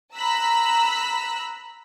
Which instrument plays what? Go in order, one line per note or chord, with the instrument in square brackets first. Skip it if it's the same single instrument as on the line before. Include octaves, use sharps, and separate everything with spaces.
[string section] A#5 B5 E6 F#6 B6